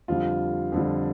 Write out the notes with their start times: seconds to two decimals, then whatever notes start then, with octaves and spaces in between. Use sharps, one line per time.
0.08 F2 D3 G3 F4
0.72 F2 D3 G3